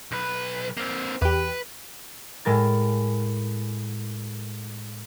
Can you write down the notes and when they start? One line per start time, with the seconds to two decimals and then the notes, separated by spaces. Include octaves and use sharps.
0.11 B1 B4
0.77 A#3 C4
1.22 E2 G4 B4
2.45 A2 G#3 A#4 A6